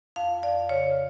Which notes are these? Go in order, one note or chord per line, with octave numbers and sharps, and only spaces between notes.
F2 F5
F2 D5
C#3 C#5